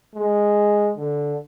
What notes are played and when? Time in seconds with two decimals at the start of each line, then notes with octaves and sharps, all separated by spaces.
0.15 G#3
0.96 D3